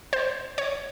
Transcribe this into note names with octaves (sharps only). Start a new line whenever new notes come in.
C5
C#5